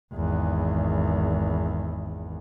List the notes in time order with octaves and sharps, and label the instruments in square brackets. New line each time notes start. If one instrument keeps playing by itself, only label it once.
[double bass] G#1 E2